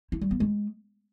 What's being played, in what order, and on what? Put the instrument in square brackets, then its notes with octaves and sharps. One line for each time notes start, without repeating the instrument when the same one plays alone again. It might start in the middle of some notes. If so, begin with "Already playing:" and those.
[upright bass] E4
G3
B3
G#3